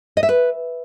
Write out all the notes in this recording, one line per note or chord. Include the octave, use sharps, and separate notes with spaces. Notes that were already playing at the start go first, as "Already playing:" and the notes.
D#5
E5
B4